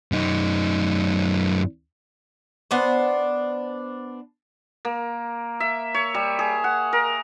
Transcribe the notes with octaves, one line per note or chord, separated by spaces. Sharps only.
F#2 D#4
B3 D4 C5
A#3
E5
C#5
G3
G#4
F#5
A#4